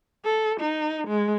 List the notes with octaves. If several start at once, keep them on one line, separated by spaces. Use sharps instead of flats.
A4
D#4
G#3